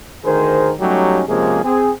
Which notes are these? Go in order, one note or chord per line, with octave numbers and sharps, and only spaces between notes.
D2 D#3 G#4 A#4 C5
F#3 G3 A3 C#4 D#4 G4
C3 F3 G#3 A#3 C#4 G#4
C4 G#4